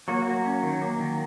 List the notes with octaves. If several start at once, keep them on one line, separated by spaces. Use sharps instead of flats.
F#3 A#3 F#4
A#3
C#4
D#3
A#3
D#3